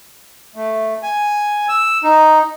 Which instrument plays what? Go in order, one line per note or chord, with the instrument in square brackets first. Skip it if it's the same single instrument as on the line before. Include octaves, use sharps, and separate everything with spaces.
[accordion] A3
G#5
E6
D#4